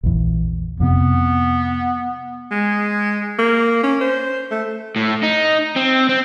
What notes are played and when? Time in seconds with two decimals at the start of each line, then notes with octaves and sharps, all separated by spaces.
0.03 A#1 E2
0.80 F2 C3 B3
2.51 G#3
3.39 A#3
3.83 C#4
4.01 C5
4.52 A3
4.96 A2
5.23 D#4
5.76 C4
6.09 C4